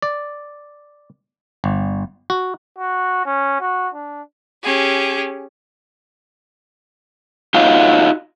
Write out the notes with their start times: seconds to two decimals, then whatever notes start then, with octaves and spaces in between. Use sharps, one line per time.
0.02 D5
1.64 G1
2.30 F#4
2.78 F#4
3.25 C#4
3.61 F#4
3.94 D4
4.63 C#4 G4 G#4
7.54 D#4 F4 F#4 C#5 D#5 F5